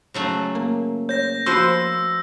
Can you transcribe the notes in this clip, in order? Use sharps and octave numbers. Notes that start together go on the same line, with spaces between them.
C#3 F#3 A3
A#3
C#5 G6 A#6
F3 F4 F#4 B4 C5 C#6 E6